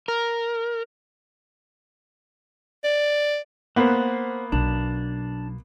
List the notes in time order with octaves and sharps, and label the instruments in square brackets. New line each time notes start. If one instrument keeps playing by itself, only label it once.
[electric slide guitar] A#4
[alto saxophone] D5
[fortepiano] A#3 B3 [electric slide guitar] C5 F#5
[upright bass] B1 [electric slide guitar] D4